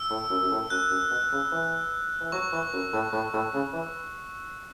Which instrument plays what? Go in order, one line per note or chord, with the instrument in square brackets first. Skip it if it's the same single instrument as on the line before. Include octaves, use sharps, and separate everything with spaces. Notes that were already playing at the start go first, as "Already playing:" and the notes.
Already playing: [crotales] E6
[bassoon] A2
F#2
F#2
A2
[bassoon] F#2 [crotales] F#6
[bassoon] F#2
B2
C#3
E3
E3
[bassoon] F#3 [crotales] C#6
[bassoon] E3
F#2
A2
A2
A2
C#3
E3